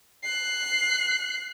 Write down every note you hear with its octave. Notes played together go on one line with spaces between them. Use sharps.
F#6 C7